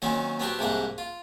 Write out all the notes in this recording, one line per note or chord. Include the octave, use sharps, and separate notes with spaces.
A#2 D#3 F#3 A#3 C4 C#4
B3 C4 D4 F#4 G4
C2 G#2 C3 A#3 D4 F#5
F4